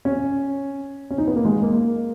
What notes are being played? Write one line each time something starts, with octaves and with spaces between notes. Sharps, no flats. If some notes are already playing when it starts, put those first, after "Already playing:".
C#4
C#4
D#4
B3
A#3
G#3
A#3